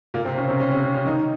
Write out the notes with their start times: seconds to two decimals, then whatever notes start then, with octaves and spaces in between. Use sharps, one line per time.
0.14 A#2 A#3
0.25 C3 C4
0.37 C#3 C#4
0.49 C3 C4
0.60 C#3 C#4
0.71 C3 C4
0.83 C#3 C#4
0.94 C#3 C#4
1.06 D#3 D#4